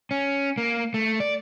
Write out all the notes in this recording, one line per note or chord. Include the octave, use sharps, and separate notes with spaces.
C#4
A#3
A3
D5